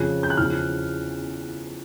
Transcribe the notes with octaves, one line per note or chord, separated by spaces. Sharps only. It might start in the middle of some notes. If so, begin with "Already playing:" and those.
Already playing: F2 C#3 F3 F#6
G6
F#6
E2 C#3 F3 F6